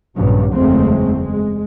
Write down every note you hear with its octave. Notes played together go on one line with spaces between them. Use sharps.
A#1 G2 C#3 F#3
F#1 E2 G#3 A3 C4
G#3